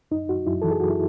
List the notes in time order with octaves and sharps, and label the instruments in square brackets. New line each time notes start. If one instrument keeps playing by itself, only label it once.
[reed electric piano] F#2 D#4
F#2 F#4
F#2 E4
E3 A4
G#4
F#2 F#4
E4